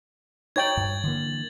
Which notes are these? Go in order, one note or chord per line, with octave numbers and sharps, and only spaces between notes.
D#4 C#5 G5 G#6 A6 F#7
G2
D3 E3 A#3